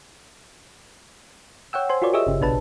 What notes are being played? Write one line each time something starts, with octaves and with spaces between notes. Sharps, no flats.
C#5 F#5 G5 E6
C5 G#5 C6
F4 F#4 A#4 C#5 D5
G4 G#4 C#5 D#5 E5 E6
G1 C#3
A#1 B2 D4 B4 A5